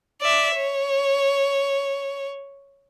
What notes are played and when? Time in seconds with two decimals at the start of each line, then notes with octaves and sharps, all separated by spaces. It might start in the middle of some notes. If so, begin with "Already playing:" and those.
0.21 D5 E5
0.56 C#5